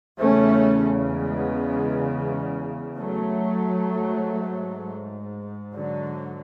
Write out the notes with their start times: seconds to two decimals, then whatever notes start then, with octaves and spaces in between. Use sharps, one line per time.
0.19 E2 C#3 A3 C#4
1.12 G#3 B3
2.97 F#3 A3
3.90 G#2
5.74 D3 F#3